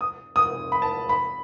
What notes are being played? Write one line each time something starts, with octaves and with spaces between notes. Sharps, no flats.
D#6
D#6
B5
A5
B5